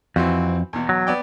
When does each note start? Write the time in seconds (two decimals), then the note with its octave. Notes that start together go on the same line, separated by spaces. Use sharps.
0.16 F2 E3 C4 F#4
0.73 E2 B2
0.89 F#3
1.07 B3 D5 G5